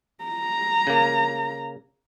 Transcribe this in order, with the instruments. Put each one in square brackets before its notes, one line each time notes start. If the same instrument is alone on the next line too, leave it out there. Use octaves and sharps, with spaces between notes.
[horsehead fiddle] A#5
[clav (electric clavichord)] C#3 A#3